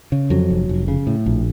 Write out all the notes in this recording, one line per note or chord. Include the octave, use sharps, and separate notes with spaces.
C#3
F2 F#3
F1
F1
C#3
A2
A#1